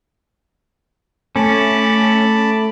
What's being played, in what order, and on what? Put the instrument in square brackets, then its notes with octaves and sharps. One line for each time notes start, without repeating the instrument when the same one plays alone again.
[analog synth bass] A3 [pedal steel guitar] C#4 [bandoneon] A5 B5 D6